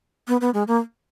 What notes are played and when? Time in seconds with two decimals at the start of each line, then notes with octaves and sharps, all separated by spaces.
0.28 B3
0.41 B3
0.54 G#3
0.68 A#3